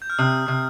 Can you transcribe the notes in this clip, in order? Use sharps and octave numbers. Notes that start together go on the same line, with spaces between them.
G6
F6
C3 D#6
C3